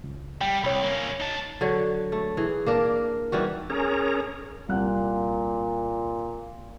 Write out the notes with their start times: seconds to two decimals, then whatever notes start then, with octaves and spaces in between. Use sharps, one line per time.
0.04 C#2
0.41 G3 G5
0.64 C2 C#5 B5
0.83 A#3 C#4
1.20 D#4 A5
1.61 D3 F#3 C#5
2.12 A3
2.37 E3 G#4
2.66 A#3 D4 A#4
3.32 D#3 E3 G3 F#4
3.70 C#4 G#4 A#4 C#5 A#5
4.69 C2 A#2 F#5 F#6